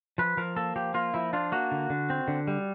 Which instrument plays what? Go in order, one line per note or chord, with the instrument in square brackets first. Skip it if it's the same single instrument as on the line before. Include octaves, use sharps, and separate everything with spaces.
[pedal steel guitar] F3 B4
F3 A#4
A#3 A4
F3 G4
A#3 F4
F3 E4
D4 F4
A#3 F#4
D3
D3
C4
D3
G3